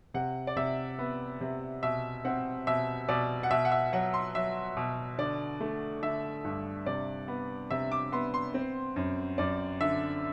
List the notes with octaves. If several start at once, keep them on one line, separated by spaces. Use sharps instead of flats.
C3 F#5
D5
C3 E5
B3
C3
B2 E5
C4 F#5
B2 E5
B2 D5
F#5
B2 E5
F#5
E5
F#3 F#5
C6
F#3 E5
B2
D3 D5
A3
D3 E5
G2
C3 D5
B3
C3 E5
D6
B3 C6
C6
C4
F#2
F#2 D5
D3 E5